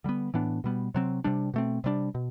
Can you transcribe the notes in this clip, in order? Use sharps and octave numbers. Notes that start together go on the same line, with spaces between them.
D3 G3 B3
A2 E3 B3 D4
B2 G3 B3
C3 F#3 C4
C3 G3 D4
B2 A3 C4
C3 G3 B3 D4
B2